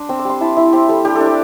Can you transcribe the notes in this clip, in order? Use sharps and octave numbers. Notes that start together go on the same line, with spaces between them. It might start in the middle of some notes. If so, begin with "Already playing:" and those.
Already playing: D4 C6
C4 E6
D6
G3 C6
E4 A5
E4 E5
C4 G4
G3 A4
D4 G4
A4
D4
D5